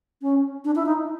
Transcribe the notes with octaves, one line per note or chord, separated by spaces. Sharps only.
C#4
D4
E4
D#4